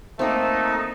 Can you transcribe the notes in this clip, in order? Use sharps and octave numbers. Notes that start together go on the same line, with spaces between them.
A3 A#3 C4 D#4